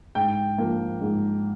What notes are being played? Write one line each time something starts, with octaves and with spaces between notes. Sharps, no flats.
G#2 G5
F3 A#3
G#2